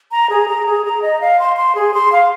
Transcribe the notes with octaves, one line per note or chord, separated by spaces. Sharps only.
A#5
G#4
A#5
G#4
A#5
D#5
F5
C6
C6
G#4
C6
F5